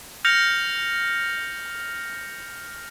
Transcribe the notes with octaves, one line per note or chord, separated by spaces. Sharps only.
F6 G6 A#6 C#7 F7